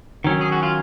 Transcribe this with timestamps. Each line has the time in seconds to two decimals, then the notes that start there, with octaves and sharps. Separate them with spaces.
0.24 D#3 F#3 C#4
0.41 G#4
0.52 F#4
0.63 F4